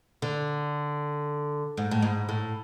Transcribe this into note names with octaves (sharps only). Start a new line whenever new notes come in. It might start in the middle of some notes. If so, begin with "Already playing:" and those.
D3
G#2
A2
G#2
A2